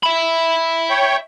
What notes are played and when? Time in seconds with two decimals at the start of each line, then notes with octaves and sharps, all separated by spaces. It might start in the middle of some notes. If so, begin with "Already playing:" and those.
0.03 E5 B5
0.90 C#5 G5